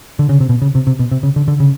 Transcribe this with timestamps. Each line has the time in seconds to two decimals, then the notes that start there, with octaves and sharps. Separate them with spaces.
0.19 D3
0.29 C#3
0.40 C3
0.49 B2
0.62 C#3
0.75 C3
0.87 C3
0.99 B2
1.11 C3
1.23 C#3
1.36 D3
1.48 D3
1.60 C#3